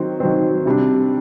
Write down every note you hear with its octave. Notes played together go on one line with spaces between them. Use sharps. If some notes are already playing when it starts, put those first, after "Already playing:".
Already playing: D#3 F#3 C4
D#3 F#3 C4
C3 G3 D4